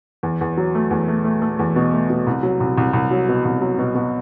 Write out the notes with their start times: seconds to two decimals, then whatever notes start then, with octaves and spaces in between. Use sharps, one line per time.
0.23 E2
0.41 E2
0.57 F#3
0.75 A3
0.91 E2
1.08 A3
1.25 A3
1.42 A3
1.59 E2
1.76 B2
1.93 A3
2.10 B2
2.27 C2
2.43 F#3
2.60 C2
2.78 C2
2.93 C2
3.11 F#3
3.28 B2
3.45 C2
3.61 F#3
3.79 B2
3.95 B2